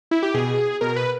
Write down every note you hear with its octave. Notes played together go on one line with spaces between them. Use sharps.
E4
G4
B2 G#4
B2 A#4
B4